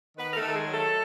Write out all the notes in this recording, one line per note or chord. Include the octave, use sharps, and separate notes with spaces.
D#3 B3 B4
A#4
A3 A4
D#3
A4
G#3 G#4
F#3
A3 A4